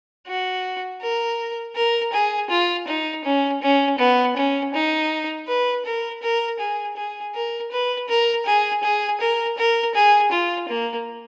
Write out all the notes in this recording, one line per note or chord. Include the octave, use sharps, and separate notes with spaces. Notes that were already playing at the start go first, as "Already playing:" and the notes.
F#4
A#4
A#4
G#4
F4
D#4
C#4
C#4
B3
C#4
D#4
B4
A#4
A#4
G#4
G#4
A#4
B4
A#4
G#4
G#4
A#4
A#4
G#4
F4
A#3